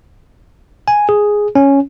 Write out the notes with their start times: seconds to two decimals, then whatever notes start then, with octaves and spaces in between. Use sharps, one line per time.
0.88 G#5
1.09 G#4
1.55 C#4